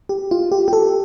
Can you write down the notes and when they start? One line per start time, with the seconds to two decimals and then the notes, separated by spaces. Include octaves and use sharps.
0.09 G4
0.31 F4
0.52 G4
0.68 G4
0.73 A4